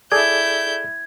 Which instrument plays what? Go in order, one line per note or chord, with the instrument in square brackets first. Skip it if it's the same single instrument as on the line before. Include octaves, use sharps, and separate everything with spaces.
[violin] E4 G6 [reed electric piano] G#4 A4 D5 [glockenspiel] G#6